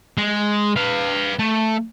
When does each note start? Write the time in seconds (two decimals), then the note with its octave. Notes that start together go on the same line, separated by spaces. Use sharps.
0.18 G#3
0.77 B4 F5
1.39 A3